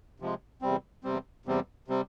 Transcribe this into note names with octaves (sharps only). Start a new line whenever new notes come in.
C3 F3 G#3
E2 C3 G3 C4
E2 C3 G3 C4
E2 C3 G3 C4
C3 G3 C4